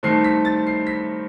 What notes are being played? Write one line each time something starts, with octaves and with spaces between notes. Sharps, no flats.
G2 D#3 A3 C4 C7
B6
A6
C7
B6